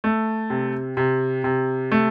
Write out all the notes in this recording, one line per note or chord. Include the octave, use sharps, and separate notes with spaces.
A3
C3
C3
C3
A3